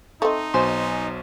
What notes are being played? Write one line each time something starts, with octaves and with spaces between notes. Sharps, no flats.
A3 C4 D#4 D#5
B1 B2 C5 G#5 C6